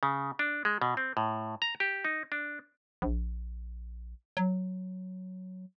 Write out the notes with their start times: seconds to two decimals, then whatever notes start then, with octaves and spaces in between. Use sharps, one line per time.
0.03 C#3
0.39 D4
0.65 G#3
0.82 B2
0.97 C4
1.17 A2
1.62 A#5
1.80 G4
2.05 D#4
2.32 D4
3.02 A#1
4.37 F#3